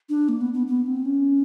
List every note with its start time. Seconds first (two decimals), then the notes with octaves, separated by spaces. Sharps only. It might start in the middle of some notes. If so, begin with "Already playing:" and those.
0.09 D4
0.29 A#3
0.41 B3
0.53 B3
0.67 B3
0.86 C4
1.05 C#4